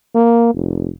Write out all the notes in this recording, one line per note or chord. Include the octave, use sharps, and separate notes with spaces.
A#3
F1